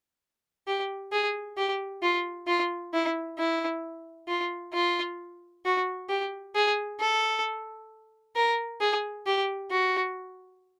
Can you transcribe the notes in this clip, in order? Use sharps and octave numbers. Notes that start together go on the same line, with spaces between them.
G4
G#4
G4
F4
F4
E4
E4
F4
F4
F#4
G4
G#4
A4
A#4
G#4
G4
F#4